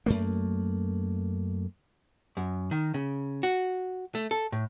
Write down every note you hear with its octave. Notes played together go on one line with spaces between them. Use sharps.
F#2 A3 A#3
F#2
D#3
C#3
F#4
A3
A4
A2